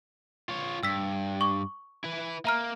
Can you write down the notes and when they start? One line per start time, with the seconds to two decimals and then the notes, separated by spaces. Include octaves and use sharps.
0.49 F4 C#5
0.83 G2 E6 B6
1.41 C#6 D6
2.04 E4 B4
2.45 A#3 E5 A#5 F6